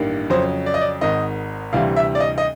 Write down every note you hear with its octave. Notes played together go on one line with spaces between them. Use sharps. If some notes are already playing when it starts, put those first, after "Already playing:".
Already playing: A1 G2 D#3 G3 A#3
F2 C#3 F#3 C5
D5
D#5
D5
G#1 G#2 D#3 D#5
D2 C3 E3 G3 F5
E5
D5
D#5
D#5